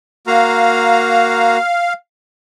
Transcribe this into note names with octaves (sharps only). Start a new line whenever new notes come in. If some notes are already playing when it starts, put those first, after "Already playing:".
A#3 F#4 F5 A#5